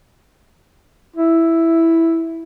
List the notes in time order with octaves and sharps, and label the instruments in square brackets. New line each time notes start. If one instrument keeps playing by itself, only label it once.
[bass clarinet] E4